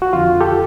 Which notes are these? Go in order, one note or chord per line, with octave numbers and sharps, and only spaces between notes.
F#4
F2 D3 F4
G4 A4